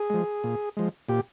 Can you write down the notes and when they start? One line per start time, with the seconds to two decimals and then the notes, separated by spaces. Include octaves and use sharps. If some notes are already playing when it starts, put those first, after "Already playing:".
Already playing: G#4
0.10 F3 G#3
0.44 A#2
0.77 F3 G#3
1.09 A#2 G4